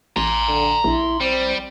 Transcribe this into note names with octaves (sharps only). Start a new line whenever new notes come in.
A1 A#5 C6
D3
A#1 E4
G3 C4